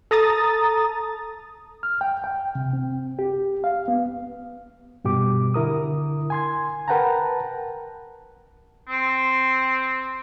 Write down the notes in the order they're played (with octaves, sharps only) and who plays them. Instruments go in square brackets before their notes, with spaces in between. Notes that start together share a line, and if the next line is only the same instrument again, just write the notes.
[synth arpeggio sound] A4 A#5 D#6 A6
[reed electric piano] F6
G5
G5
C3
C4
G4
F5
B3
G2 B2 G4 D6
D3 E4 A#4 D#6
G#5 C6 G#6
A#4 B4 F#5 G5 A5 A#5
[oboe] C4